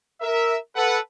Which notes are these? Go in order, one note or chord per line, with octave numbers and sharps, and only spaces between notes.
A#4 E5
A4 B4 F#5